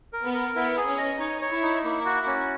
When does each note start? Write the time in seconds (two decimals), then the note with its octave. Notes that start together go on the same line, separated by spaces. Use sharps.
0.13 A#4
0.23 B3
0.34 A#4
0.55 B3 E4
0.77 G#4
0.87 C#4
0.98 D#5
1.20 D#4 C#5
1.41 C#5
1.51 E4
1.63 D#4
1.84 A#3 E4
2.05 F#4
2.27 C#4